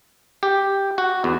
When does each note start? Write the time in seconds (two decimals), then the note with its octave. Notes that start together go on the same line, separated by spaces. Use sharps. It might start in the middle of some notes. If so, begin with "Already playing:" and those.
0.43 G4
0.98 F#4
1.24 E2